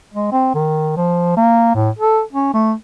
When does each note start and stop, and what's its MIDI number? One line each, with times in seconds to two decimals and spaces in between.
0.14 0.31 56
0.32 0.52 60
0.55 0.96 51
0.97 1.32 53
1.37 1.73 58
1.75 1.90 45
1.99 2.21 69
2.33 2.51 61
2.54 2.73 57